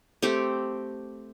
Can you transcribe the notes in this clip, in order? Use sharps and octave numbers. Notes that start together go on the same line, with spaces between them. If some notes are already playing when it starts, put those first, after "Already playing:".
A3 C4 G4